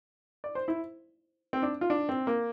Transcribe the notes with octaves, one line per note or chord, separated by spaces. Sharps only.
D5
C5
E4
C4
D4
F4
D4
C4
A#3